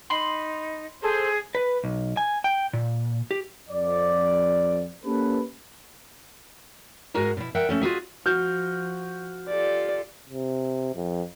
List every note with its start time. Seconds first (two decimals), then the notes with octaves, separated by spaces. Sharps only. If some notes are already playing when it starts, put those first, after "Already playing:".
0.10 D#4 B5 C6
1.02 G#4 A4 C5
1.55 B4
1.84 B1
2.17 G#5
2.44 G5
2.73 A#2
3.31 G4
3.69 F2 D5
5.05 A#3 C#4 G4 A4 B4
7.14 G#2 G#3 F#4 G#4 A#4 A#5
7.37 B2 E4
7.55 A#4 E5 F#5 G5
7.69 A3 C#4 A4
7.81 F4 F#4 G#4 E5
8.26 F3 F#4 F6 G6
9.48 F4 G4 A4 D5
10.30 C3
10.96 F2